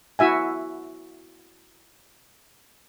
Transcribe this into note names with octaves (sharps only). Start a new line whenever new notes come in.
E4 F#4 E5 G#5